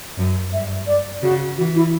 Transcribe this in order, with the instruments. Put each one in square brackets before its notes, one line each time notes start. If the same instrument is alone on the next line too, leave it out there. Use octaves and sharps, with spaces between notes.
[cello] F#2
[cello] G2 [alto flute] E5
[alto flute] D5
[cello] C#3 [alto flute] F#4
[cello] E3 [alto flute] F#4
[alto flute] E4